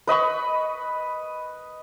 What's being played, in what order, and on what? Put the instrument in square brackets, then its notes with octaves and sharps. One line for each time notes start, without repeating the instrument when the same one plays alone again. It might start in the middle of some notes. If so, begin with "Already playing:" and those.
[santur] B4 D#5 B5 C#6